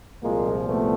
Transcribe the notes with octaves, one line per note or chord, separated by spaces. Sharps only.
C2 A#2 F3 G#3 A#3
A3 B3